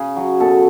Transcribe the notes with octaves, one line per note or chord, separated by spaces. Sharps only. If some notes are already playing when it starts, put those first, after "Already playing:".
Already playing: C#3 G#4
F#3
B2 A4